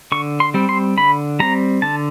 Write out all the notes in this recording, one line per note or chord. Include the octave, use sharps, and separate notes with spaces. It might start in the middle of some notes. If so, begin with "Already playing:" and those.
D3 C#6
C6
G3 C4
C6
D3 B5
G3 C4 A#5
D3 A5